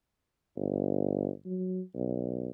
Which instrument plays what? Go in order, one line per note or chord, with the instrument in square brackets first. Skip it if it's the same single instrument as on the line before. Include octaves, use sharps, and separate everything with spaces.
[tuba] G1
F#3
B1